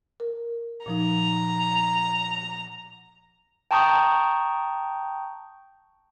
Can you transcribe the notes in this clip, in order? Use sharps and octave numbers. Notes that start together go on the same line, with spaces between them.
A#4
A#2 F3 D#4 A#5
G5 A5 A#5 C#6 D#6 G6